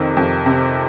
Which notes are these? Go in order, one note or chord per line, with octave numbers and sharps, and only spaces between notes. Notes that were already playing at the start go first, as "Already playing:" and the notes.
Already playing: F2 C3 D#3
F2
C3